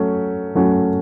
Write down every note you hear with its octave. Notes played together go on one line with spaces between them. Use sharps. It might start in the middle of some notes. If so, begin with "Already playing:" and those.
Already playing: F#3 A3 C#4
F#3 A3 C#4 F#4